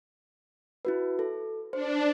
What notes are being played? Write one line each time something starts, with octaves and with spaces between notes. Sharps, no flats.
E4 F#4 B4
A4
D4 C5